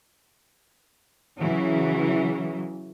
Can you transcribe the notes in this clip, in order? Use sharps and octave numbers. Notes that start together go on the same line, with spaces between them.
C#3 E3 F#3